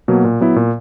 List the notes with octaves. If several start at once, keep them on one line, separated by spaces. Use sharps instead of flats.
B2 F#3 A#3
A#2
F#3 B3 E4
A#2